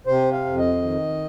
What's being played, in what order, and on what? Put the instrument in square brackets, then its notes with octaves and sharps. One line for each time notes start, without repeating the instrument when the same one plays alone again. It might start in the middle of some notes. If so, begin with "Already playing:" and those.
[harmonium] C3 C5
F5
F2
D#5
D#3